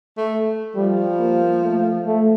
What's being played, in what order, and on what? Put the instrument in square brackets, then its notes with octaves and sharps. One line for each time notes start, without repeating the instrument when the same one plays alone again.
[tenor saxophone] A3
[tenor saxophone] F3 [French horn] G3
[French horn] A#3
A3
A3